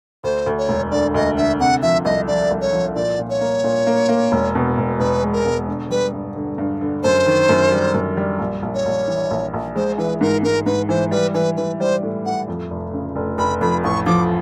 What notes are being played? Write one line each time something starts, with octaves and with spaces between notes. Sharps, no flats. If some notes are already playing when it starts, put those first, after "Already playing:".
D2 C5
D2
C#5
E1
D3 D5
D2 D#5
D3 E5
C3 F#5
F3 E5
C2 D#5
F3 D5
C2
C#5
F3
A#2 D5
A#2
C#5
A#3
A#2
A#3
A#3
E1
B2
E1
E1 B4
G#3
A#4
B2
D3
G3 B4
G2
D3
G2
D3
F#2 C5
D#3
F#2
G3
F#2
G3
A#1
A#1
C#5
A#1
E3
A#1
A#1
G#3 C5
E3 B4
G#2 A#4
G#2 A#4
G#2 B4
E3 C5
G3 B4
E3 B4
E3 B4
G3 C5
A2
A2 F#5
F2
F1
C#3
F1
F1 B5
F2 B5
A1 C#6
F3 D6